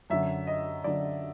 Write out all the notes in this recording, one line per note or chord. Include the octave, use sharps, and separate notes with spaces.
F#2 D3 E5
D#5
F#2 D3 D5